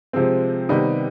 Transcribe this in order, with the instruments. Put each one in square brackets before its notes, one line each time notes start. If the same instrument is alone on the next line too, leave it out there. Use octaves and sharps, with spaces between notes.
[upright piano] C3 F3 G#3 C4
C3 D#3 G3 B3 D#4